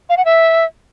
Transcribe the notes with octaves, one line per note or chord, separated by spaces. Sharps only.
F5
F#5
E5